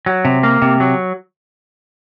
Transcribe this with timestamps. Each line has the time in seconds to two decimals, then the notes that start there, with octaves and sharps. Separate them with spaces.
0.06 F#3
0.25 C3
0.43 A#3
0.62 C3
0.80 F#3